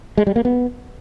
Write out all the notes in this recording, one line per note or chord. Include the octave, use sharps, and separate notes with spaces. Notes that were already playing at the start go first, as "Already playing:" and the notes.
G#3
G3
A#3
B3